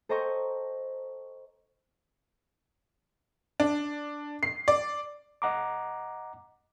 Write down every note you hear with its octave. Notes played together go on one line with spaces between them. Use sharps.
A4 C5 D#5 G5 A#5 C#6
D4
C7
D5
D#5 F#5 A#5 D6